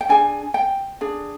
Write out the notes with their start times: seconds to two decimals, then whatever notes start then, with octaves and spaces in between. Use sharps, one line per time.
0.01 G5
0.09 D4 G#4 G#5
0.54 G5
1.01 D4 G#4